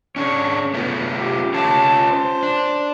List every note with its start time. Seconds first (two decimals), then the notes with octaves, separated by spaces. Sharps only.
0.16 C#4 D4 G#4 C#5
0.74 A3 B3 C#4 F4
1.18 G4
1.54 C#4 F4 C#5 A5
2.09 C5
2.43 D4